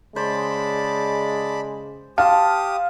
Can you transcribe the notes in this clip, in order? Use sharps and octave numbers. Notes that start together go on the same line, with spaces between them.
C#3 G#3 C5 D5 A5 B5
G4 F5 A5 C6 D6 D#6